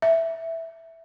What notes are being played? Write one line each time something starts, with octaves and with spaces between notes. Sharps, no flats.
E5